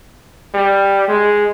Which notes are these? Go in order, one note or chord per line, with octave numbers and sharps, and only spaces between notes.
G3
G#3